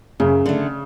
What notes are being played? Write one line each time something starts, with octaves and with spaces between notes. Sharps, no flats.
F#2 C#3
D3 A3